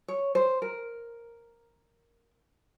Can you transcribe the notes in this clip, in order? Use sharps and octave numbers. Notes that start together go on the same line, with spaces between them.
C#5
C5
A#4